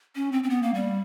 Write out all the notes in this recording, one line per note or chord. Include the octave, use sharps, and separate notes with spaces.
C#4
C4
C4
B3
A#3
G3